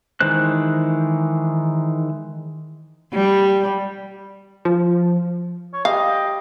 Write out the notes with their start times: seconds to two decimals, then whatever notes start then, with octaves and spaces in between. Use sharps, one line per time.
0.20 D#3 E3 G#3 C5 F#6
3.14 G3
4.65 F3
5.73 C#5
5.85 G3 G4 D#5 F5 A5
6.08 G5